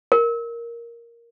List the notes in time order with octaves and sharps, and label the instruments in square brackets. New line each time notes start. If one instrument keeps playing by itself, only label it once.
[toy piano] A#4